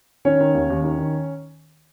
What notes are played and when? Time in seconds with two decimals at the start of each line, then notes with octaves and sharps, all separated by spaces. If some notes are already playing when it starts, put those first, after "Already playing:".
0.25 D#3 C#4 C#5
0.41 D#3
0.55 D#2
0.70 D#2
0.84 D#3
0.99 D#3